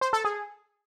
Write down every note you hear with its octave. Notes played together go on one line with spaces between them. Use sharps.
C5
A4
G#4